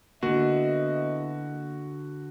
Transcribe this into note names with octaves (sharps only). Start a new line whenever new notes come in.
D3 A#3 B3 E4 F#4 D#5